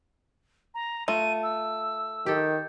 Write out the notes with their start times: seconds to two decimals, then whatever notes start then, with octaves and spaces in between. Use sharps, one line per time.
0.75 A#5
1.08 A3 F4 D#7
1.43 E6
2.26 D#3 G4 A4